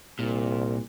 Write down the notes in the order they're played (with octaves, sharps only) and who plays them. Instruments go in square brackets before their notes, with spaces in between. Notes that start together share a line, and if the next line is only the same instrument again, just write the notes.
[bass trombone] C2 [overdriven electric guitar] A#2